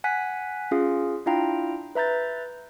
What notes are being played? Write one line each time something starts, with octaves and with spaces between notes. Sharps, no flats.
F#5 G#5 F#6 B6
C#4 F4 G#4 F5
D4 E4 F4 F5 G5 A#5
B4 E5 A#5 G6 A6